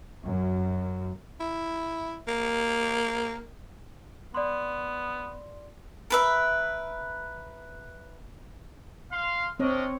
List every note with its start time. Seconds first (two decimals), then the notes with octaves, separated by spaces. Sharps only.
0.23 F#2
1.40 E4
2.27 A#3
4.34 B3 D5 C6
6.10 A#4 B4 E5
9.11 F5 C6
9.60 C4 D4 A#4 C#5 D#5